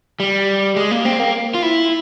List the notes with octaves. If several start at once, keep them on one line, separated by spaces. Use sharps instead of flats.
G3
G#3
A#3
C4
A#3
F4
E4